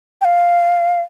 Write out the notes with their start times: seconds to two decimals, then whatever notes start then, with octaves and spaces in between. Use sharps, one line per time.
0.21 G5
0.25 F5